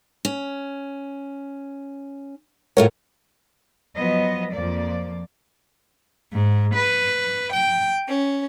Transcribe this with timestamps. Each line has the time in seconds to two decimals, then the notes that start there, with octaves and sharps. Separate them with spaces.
0.25 C#4
2.77 A2 A3 F4 F#4 A#4 C#5
3.95 F3 F#3 B3 D#5
4.54 F2 F3 A#3 D5
6.32 G#2
6.74 B4
7.52 G5
8.06 C#4